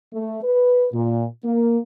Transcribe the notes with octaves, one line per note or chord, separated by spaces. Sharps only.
A3
B4
A#2
A#3